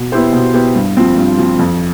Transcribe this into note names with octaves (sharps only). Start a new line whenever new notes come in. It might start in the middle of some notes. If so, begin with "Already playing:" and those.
Already playing: B2
B3 E4 G4 C5
B2
B3 E4 G4 C5
G2
F3 C4
G2
F3 C4
F2